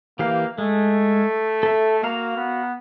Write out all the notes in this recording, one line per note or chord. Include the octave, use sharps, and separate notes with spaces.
E3 A#3 G4 F5
G#3 A3
A4 E5
A#3 F#4 F5 A#5
B3